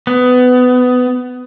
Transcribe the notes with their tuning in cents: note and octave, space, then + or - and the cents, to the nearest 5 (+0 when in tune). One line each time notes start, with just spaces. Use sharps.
B3 +20